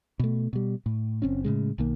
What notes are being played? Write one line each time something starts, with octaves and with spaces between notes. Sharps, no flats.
B2 A3
B2 G3
A2
F#1 C4 C#4
A2 C#3 G#3
B1 D#3 A#3